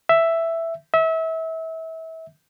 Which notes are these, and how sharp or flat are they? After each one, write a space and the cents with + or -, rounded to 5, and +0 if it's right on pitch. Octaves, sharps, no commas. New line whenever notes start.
E5 +5
E5 -30